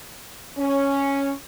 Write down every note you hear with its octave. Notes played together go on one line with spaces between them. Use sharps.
C#4